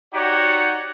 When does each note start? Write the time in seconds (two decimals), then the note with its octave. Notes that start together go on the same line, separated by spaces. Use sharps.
0.13 D#4 F#4 G4 C#5 D5 F#5